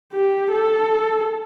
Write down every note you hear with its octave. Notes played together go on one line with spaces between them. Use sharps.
G4
A4